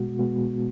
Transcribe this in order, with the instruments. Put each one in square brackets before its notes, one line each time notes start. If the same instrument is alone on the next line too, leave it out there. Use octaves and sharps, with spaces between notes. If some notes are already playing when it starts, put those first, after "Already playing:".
Already playing: [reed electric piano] B2 G#3 B3 F#4
B2 G#3 B3 F#4